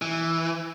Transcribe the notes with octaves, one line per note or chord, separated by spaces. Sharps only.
E3